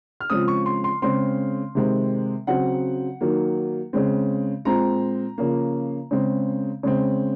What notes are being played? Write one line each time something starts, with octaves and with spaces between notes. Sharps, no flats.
F6
C#3 F3 G#3 C4 D#6
C#6
C6
C6
C#3 G#3 C4 C6
C3 D#3 G#3 C4
C#3 F#3 C4 F#5
D#3 F#3 A#3
C#3 G#3 C4
A#2 G#3 C4 A#5
C#3 F3 A#3
C#3 G#3 C4
C#3 G#3 C4